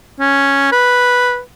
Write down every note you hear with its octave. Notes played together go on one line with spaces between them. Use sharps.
C#4
B4